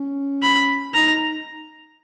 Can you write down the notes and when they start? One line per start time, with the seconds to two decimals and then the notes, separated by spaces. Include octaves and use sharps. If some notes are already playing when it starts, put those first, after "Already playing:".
Already playing: C#4
0.43 B5
0.93 D#4 A#5